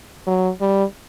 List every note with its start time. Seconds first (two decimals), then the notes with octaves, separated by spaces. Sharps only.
0.27 F#3
0.61 G3